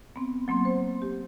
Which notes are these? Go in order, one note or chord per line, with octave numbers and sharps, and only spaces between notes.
B3 C4
F#3 A#3 C4 C6
C5
G4